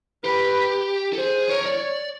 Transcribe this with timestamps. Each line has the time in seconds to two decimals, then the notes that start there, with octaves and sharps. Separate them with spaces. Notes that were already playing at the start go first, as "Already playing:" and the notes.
0.24 G4 B4
1.13 A4
1.18 G#4 C5
1.49 A#4 C#5
1.66 D5